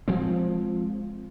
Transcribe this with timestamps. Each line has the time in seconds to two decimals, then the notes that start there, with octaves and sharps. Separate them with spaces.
0.08 F3 G#3 C4